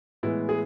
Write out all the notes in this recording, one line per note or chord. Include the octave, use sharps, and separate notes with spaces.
A2 E3 G#3 B3 E4
G#4